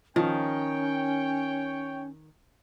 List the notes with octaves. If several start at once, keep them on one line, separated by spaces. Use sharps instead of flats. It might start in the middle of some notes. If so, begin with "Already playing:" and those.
D#3 F3 C#4 C#5 G5